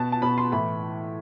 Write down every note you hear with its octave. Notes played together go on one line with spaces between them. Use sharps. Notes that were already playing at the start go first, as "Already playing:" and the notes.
Already playing: B2 A5
A5
B2 B5
C6
A2 E3 B5